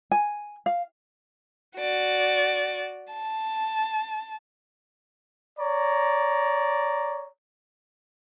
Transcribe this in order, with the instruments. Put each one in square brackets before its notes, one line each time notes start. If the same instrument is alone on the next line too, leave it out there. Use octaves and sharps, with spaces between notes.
[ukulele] G#5
F5
[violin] F#4 D5
A5
[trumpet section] C#5 D5 A#5